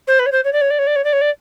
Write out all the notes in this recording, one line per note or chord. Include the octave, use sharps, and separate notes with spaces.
C5
B4
C#5
C5
C#5
D5
C#5
D5
C#5
D5
C#5
D5
C#5
D5